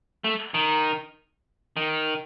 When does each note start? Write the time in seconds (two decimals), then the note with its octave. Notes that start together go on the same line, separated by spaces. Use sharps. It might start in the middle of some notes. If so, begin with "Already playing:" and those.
0.24 A3
0.54 D#3
1.77 D#3